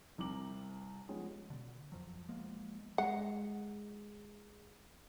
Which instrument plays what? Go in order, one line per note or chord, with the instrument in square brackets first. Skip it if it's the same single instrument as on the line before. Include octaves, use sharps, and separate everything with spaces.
[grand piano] C2 C4 A#5 D6 F#7
F3 G3 G#3 B3 C#4
[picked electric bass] B2 D3
F2 F3 F#3
F3 G#3 A#3 B3
[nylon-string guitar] G#3 [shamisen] F#5